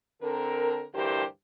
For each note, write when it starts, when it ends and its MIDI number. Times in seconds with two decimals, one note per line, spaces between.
0.22 0.85 50
0.22 0.85 60
0.22 0.85 69
0.22 0.85 70
0.95 1.24 38
0.95 1.24 43
0.95 1.24 52
0.95 1.24 67
0.95 1.24 70
0.95 1.24 72